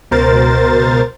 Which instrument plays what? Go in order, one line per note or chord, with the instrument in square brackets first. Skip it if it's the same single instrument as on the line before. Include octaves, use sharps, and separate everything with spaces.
[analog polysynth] C#2 B2 A#4 C5 A6